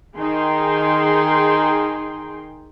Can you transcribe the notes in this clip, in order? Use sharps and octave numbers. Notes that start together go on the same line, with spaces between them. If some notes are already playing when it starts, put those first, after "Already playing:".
D#3 D#4 G#4 G5 C6